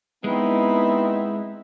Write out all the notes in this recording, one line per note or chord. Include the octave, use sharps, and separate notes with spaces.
G#3 B3 C4 D#4 E4